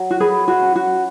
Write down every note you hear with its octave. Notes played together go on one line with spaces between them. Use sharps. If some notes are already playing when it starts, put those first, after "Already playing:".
Already playing: F#3
F#4
G#4 B4
F#4
C#4
F#4